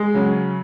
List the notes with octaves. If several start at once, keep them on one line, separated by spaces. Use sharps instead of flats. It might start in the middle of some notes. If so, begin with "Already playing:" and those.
Already playing: G#3
C#3 F#3 C#4